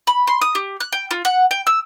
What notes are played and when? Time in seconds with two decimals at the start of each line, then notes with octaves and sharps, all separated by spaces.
0.07 B5
0.27 C6
0.41 D#6
0.55 G4
0.80 F#6
0.92 G5
1.11 F4
1.25 F#5
1.51 G5
1.67 E6